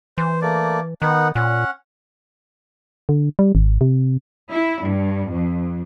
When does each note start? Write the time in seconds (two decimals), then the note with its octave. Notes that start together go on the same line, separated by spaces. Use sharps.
0.18 E3 C5
0.42 A3 A#3 D5
1.02 D#3 B3 D#4 F#5
1.35 A#2 C#4 F#5
3.09 D3
3.39 G3
3.55 G#1
3.81 C3
4.51 E4
4.84 G2
5.31 F2